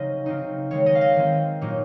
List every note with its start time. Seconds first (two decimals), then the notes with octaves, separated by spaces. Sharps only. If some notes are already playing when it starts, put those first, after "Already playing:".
Already playing: C#3 F#3 C4 D#4 D#5
0.26 C#3 F#3 C4 D#4
0.71 D#3 G#3 C4 C#5
0.86 D#5
0.95 F5
1.01 D#5
1.16 D#3 G#3 C4
1.61 A#2 F#3 A#3 D#4